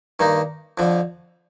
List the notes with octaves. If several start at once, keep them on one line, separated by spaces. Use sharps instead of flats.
G2 D#3 A#3 D#4
F2 D3 F3